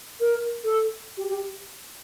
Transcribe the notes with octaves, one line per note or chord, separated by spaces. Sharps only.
A#4
A4
G4
G4